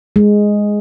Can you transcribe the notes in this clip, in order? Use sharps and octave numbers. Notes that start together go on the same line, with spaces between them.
G#3